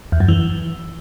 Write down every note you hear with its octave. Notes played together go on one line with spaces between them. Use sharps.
E2
F#2
E3